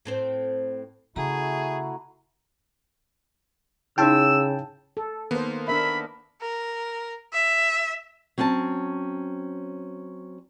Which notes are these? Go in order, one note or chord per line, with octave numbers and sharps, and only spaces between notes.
A2 C4 C5
C#3 A3 E4 F#4 G#4 A#5
C#3 D#4 E4 G5 A5 E6
A4
D#3 A#3 B3 C5
D4 A#4 E5 B5
A#4
E5
F#3 C4 C#4 F#5 A5